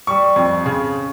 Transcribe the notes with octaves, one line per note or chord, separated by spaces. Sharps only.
G3 C#6
F2
C#3